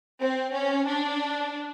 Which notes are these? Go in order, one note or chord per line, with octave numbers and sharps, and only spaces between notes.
C4
C#4
D4